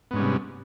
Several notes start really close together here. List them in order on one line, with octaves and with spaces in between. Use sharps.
B3 G#2 C#4 G3 C3